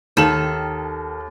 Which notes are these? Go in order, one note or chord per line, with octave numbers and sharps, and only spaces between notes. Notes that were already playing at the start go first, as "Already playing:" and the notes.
D#2 D#3 A4 E7 F#7